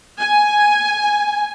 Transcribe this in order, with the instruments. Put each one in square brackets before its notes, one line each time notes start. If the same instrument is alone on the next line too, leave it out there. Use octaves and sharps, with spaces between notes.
[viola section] G#5